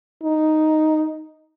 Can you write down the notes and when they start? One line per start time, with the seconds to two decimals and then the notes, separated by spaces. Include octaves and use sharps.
0.23 D#4